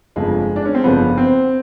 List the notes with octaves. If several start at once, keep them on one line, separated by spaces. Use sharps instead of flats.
G1 F2 C#3 F3 G#3
D4
C#4
C4
G1 F2 C#3 F3 B3
C4